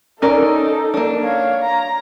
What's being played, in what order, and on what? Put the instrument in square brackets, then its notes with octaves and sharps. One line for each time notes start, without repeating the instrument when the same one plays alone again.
[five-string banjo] C#4 A#4 D5 [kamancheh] D#4 A4
[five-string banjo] A#3 D4
[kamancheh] C#5 F5
A#5